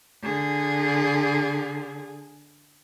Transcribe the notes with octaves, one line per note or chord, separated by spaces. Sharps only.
D3 G#4